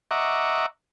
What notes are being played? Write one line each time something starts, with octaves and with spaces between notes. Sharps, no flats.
D#5 E5 F#5 A#5 C#6 D6